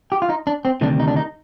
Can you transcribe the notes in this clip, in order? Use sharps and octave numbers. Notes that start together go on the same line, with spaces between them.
G4
F4
D#4
D4
C4
D2 C3 D#3 G3 D4
D#4
D4
D#4